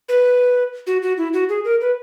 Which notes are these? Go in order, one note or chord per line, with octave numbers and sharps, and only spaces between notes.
B4
F#4
F#4
E4
F#4
G#4
A#4
B4